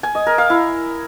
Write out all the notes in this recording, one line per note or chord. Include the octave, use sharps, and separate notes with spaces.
G#5
D#5
A#4
F5
E4